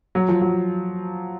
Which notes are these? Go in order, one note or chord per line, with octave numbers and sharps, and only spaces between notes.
F#3
F3
F#3